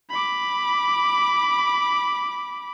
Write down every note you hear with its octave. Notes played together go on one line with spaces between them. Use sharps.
B5 D6